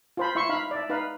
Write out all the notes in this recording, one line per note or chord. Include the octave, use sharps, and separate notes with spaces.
F4 C5 B5
E4 E5 C6 C#6
D#4 F5 B5
D5 E5
D#4 B4 F5 B5